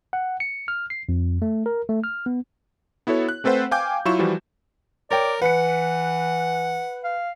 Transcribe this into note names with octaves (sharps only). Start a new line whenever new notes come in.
F#5
C#7
F6
C7
F2
A3
A#4
A3
F6
B3
B3 E4 F#4 A4 C#5
F#6
A3 C4 A4 B4 C5 F#5
F5 G5 G#5 D6 G6
F#3 E4 F4 C#6 E7
E3 F3 G3 F#4
A#4 C#5 D5 G5
E3 B4 F#5 C#7
F5